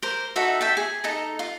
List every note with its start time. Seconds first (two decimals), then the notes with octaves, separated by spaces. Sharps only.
0.03 A#4 C5
0.36 D#4 F#4 A4 E5
0.61 E5 G5 A5
0.77 G#4
1.04 D#4 A4 A#5
1.39 F4